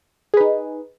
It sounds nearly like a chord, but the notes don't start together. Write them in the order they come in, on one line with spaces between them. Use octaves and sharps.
G#4 B4 D#4